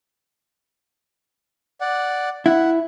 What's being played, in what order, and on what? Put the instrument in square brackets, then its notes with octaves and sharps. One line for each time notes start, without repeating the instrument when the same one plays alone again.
[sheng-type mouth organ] D5 F#5
[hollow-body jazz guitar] E4 [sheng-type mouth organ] F#5